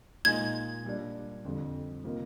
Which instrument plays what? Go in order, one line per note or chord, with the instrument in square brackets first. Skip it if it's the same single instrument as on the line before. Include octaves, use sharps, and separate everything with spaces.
[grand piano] A#2 G#3 D#4 [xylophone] G#6
[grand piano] A#2 G3 D4
F2 D3 G3
C3 D#3 A#3 F4